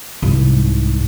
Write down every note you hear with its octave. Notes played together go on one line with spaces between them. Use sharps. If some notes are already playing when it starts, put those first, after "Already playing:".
C2 G#2